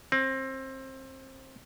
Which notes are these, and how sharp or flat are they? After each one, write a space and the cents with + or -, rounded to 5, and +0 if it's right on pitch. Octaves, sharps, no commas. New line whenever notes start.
C4 +25